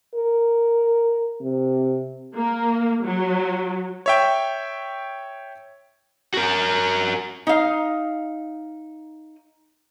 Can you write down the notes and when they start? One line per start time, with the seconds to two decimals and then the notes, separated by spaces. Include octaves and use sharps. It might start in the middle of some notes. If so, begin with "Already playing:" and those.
0.14 A#4
1.41 C3
2.36 A#3
3.04 F#3
4.06 C#5 E5 G5
6.34 F#4 A#4
7.47 D#4 F5